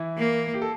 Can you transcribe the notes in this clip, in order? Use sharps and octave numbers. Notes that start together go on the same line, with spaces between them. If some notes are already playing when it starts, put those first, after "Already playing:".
Already playing: E3 E4
A#3
G4
A4